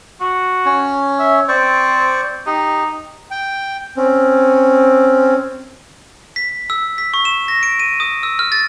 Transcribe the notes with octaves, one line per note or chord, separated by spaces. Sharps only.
F#4
C#4 C#5
E5
C4 C5 D5 C#6
D#4 G4
G5
C4 C#4
B6
E6
B6
C#6
E7
A#6
D7
D#7
D#6
E6
F6
A6